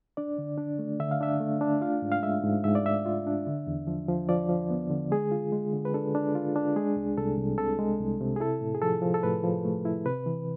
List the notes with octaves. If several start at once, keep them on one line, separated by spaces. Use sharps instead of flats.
D4 D5
D3
D4
A3
D3 E5
F5
D4 E5
A3
D4
F4 F5
G#2
F5
G#3 E5
G#2
G#2 E5
D5
G#2 E5
F4
D4
D3
E2
F3
F3
F3 D5
F3
B3
D3
G#3 G#4
F4
G#3
D3
B4
D4 A4
D4
F4
D4
G#3 G#4
C2
C2 A4
C2
C3 A4
G#3
C2
C3
G#4
E4 A4
A2
G#4
F3 A4
F3
A4
A2 B4
F3
A3
E4
C3 B4
E3